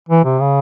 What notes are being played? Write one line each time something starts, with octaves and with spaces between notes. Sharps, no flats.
E3
C3
C#3